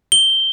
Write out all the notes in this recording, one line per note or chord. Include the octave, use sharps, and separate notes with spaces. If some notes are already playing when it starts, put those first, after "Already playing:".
G7